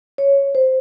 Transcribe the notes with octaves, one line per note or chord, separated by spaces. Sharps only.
C#5
C5